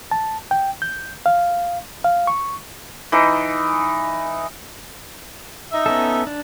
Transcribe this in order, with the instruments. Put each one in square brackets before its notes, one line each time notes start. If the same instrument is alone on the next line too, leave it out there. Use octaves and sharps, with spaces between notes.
[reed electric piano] A5
G5
G6
F5
F5
C#6
[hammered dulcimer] E3 D#4
[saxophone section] D#4 E5
[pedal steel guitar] B3 C#4 A4
D4